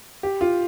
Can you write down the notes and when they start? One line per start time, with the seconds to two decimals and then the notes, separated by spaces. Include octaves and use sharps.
0.23 G4
0.41 F4